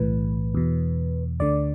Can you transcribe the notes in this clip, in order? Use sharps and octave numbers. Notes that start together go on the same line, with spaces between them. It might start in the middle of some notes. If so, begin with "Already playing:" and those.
Already playing: B1 A2 E3 B4
E2 B2
D2 D3 D5